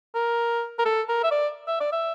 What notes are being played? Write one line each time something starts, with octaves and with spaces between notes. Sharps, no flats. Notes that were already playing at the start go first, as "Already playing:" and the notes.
A#4
A#4
A4
A#4
E5
D5
E5
D5
E5